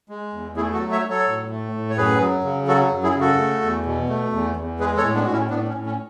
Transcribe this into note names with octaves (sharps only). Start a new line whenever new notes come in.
G#3
E2
A3 E4 G#4
F#4 A4
F#3
C#5 E5
F#3
A4 C#5
A2
A3
A2
C#5
F#2 G#4 B4
F#3
C#3
F#3 F#4 A4
F#2
E4 G#4
C#3
F#4 A4
A3
E2
B2
A3
E2
E2
G#3 G#4 B4
A4 C#5
A2
B3 D4
A2 F#4
C#4 E4
A2 B3 D4
C#4
A2
C#4